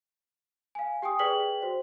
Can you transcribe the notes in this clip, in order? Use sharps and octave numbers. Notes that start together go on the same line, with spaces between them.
F5 G#5
G4 G5 G#5 D#6
G#4 B4 D5 G5 B6 F#7
F#4 C5